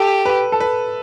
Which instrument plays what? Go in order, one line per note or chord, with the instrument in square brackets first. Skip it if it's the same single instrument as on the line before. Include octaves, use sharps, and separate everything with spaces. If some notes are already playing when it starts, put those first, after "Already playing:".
Already playing: [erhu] G4 [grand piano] A4
[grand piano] B4
A4
B4